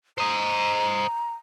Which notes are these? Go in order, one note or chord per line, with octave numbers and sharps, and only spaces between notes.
C5 D#5 A#5